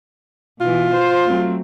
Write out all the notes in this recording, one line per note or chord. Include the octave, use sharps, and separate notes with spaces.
B2 E3 F4
C5
F#3 A3 C4